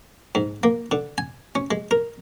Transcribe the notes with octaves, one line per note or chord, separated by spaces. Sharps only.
G#2
A#3
D3
G#5
C#4
G#3
A#4